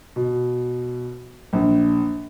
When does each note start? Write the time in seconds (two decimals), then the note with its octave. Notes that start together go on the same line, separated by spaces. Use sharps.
0.16 B2
1.53 A#1